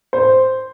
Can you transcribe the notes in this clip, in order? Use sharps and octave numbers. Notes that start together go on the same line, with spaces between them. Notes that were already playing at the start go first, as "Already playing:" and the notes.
C5